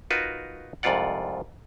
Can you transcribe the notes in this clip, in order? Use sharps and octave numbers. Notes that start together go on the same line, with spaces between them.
D#4 F4 F#4 A#4 B4
C2 F2 G#2 F4 D5 F#5